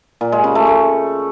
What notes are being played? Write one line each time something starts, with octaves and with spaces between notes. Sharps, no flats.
A#2
G#3
C#3
A3
A3